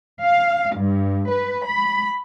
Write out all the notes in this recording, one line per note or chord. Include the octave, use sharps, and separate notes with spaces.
F5
G2
B4
B5